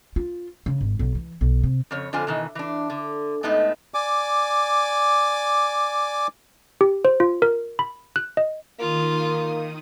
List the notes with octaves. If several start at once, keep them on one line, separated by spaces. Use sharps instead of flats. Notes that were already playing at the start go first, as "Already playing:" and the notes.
F4
C#3
G#1
B1
E3
B1
C3
F2 C#3 C#5
F2 D3 F4 C5 G#5
B2 D#3 E3
E3 D4
D3
A2 G#3 A3 B3 D#4 D#5
D5 G#5 D6
G4
C5
F4
A#4
B5
F#6
D#5
D#3 A#3 F4 D#6